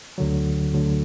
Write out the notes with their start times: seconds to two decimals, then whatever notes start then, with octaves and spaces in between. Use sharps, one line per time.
0.18 D2 D3 F#3
0.74 D2 D3 F#3